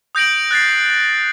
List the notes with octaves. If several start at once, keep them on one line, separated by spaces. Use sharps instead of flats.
D#6 G6 A#6 D7 F#7
F#6 A6 C7